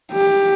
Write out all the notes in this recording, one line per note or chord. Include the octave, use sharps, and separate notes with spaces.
G4